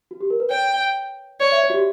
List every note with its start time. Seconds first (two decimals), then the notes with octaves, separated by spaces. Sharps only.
0.11 F#4
0.21 G4
0.30 A#4
0.40 B4
0.50 C#5 G5
1.40 C#5 D5
1.52 E5
1.64 C#5
1.70 F#4
1.74 G4